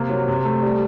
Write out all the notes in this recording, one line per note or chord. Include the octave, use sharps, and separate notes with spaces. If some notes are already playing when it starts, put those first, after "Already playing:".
Already playing: C3 A#3
F#3
C3
A3
G3